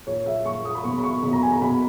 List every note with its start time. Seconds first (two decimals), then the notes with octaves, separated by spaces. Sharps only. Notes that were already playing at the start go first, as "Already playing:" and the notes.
0.07 A#2 C#5
0.26 E5
0.46 A#2 C#6
0.65 D#6
0.75 B5
0.85 B2 C#6
0.98 B5
1.04 C#6
1.23 B2 B5
1.33 A#5
1.43 G#5
1.52 A#5
1.62 B2 B5